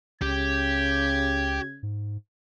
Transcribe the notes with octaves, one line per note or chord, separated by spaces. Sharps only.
C#2 C#3 G4 G#6
G#2